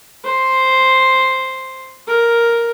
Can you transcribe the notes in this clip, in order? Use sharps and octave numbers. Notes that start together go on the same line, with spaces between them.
C5
A#4